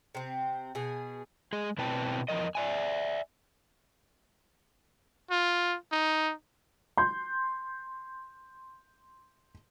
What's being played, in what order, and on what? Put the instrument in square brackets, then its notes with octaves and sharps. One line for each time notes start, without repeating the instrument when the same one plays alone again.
[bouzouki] C3 C4
B2 G#4
[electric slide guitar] G#3 G#4
B2 C4 E4 B4 G5 A5
E2 F3 A#4 D#5
D5 E5 G#5
[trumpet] F4
D#4
[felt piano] C6 G6